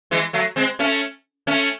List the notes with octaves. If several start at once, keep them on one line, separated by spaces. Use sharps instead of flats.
E3 G#3
F#3 A3
G#3 C4
A3 C#4
A3 C#4